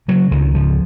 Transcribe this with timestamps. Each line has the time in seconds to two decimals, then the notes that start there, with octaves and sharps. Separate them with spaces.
0.08 C#3 F#3
0.31 C#2 D#3
0.54 C#3 F3